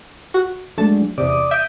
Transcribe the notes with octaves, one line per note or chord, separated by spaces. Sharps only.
F#4
F#3 G#3 A3 D4 A5 A6
E2 C3 D5 D6 D#6
E5 D#6 G6 D7